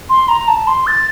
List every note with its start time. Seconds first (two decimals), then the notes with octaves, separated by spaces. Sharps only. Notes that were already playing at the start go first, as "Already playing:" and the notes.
0.10 C6
0.28 A#5
0.48 A5
0.67 C6
0.87 A6